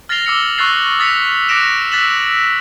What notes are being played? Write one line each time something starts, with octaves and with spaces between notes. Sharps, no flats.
F6 A6 A#6 C7 F7 G7
D6 E6 C#7 G7
C#6 E6 F#6 A6 C7
D#6 A6 B6 C#7 F7
D6 F#6 A#6 C#7 D7 E7
E6 F#6 A6 B6 E7 F#7